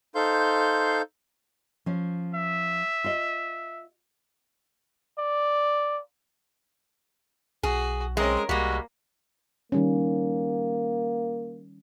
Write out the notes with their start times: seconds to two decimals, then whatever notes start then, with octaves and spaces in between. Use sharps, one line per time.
0.15 D#4 A4 C5 F5 C6 G6
1.86 F3 C#4
2.35 E5
3.04 F4 D#5
5.18 D5
7.63 B1 F#4 G#4
8.17 G#3 C4 C#4 A#4
8.49 C2 G3 G#3 A#3 F#4
9.72 D#3 G3 A#3 C#4